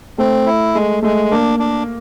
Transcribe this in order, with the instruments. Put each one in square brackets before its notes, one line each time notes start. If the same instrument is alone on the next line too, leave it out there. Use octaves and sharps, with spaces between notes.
[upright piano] A3 [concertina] C4
[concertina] E4
[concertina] G#3 [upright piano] A3
[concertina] G#3 [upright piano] A3
[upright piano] A#3 [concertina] D4
[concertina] D4